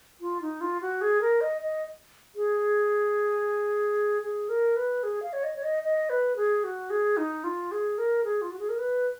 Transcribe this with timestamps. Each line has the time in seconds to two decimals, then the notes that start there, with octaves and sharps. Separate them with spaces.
0.21 F4
0.41 D#4
0.61 F4
0.81 F#4
1.01 G#4
1.21 A#4
1.41 D#5
1.61 D#5
2.35 G#4
4.22 G#4
4.49 A#4
4.76 B4
5.03 G#4
5.22 F5
5.33 C#5
5.44 D#5
5.56 C#5
5.63 D#5
5.83 D#5
6.10 B4
6.36 G#4
6.64 F#4
6.90 G#4
7.17 D#4
7.44 F4
7.71 G#4
7.98 A#4
8.24 G#4
8.42 F4
8.51 F#4
8.59 G#4
8.69 A#4
8.79 B4